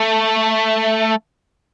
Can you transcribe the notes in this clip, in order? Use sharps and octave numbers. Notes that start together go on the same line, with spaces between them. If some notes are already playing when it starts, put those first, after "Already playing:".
Already playing: A3